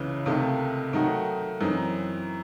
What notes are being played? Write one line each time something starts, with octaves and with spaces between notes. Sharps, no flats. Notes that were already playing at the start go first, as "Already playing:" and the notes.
Already playing: C#2 C#3 E3
C#2 C3 D#3 A3
D#3 F#3 A3 D#4 F#4
F#2 E3 C4 D#4